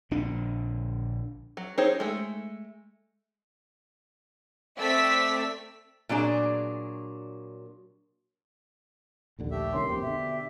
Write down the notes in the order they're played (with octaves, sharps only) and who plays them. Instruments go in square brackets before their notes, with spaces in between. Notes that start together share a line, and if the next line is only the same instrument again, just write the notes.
[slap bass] A#1 D3 D4
[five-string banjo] F#3
D#4 G4 G#4 C5 C#5
G#3 A3
[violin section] A3 C4 D5 E5 E6 B6
[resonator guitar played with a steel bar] A#2 F#3 D4 G#4
[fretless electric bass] A#1 D#2 D3
[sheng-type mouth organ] A3 G4 E5
[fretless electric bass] C2 D#3 C#4 [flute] C6
[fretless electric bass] F2 A#3 C4 [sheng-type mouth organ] G4
[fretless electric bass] B2 D3 [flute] E5